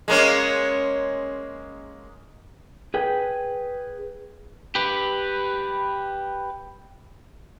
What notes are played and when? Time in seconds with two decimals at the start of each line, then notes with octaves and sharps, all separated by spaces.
0.08 G#3 A#3 C#4
2.94 G#4 B4 G5
4.75 G4 B4